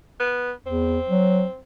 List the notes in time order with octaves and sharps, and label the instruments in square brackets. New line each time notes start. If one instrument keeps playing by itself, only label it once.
[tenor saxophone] B3
[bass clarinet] E2 [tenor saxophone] C4
[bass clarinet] F#3